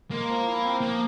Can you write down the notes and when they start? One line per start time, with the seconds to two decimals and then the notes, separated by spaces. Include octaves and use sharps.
0.10 G#3 A#3
0.28 F3
0.46 E4
0.63 C4
0.81 F3 A#3